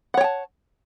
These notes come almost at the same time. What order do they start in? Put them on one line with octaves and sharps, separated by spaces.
F#5 C#5 G5 A5